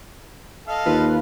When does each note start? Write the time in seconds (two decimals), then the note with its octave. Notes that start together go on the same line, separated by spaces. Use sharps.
0.68 A4 D#5 F5
0.86 D#2 F4 B4